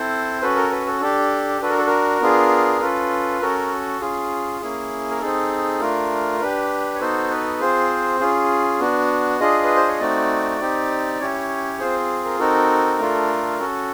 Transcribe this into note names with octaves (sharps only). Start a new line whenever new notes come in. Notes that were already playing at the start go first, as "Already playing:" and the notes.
Already playing: C4 E4 A4 C5
C#4 F#4 A4 B4
A#4
B4
A4
D4 G4 A4
D4 F#4 A4 B4
A#4
A4
A#4
B3 D4 F4 G#4
C#4 F4 A4 B4
C#4 F#4 A4 A#4
C#4 F4 G#4
A#3 C#4 E4 G#4
A#4
C4 D#4 G#4 A4
A3 D4 F4 A#4
D4 G4 B4
C#5
B3 D#4 F#4 A4 C5
B4
C4 F4 G#4 C5
C#4 F4 G#4
B3 D4 F#4
D4 F4 G#4 D#5
B4
C5
C#5
A3 C4 D#4 F#4 D5
C4 D#4 G4
C#4 E4 G4 C#5
C4 F4 G#4 C5
A#4
C4 D#4 F#4 A4 A#4
A3 D4 F4 A4
C#4 F#4 A4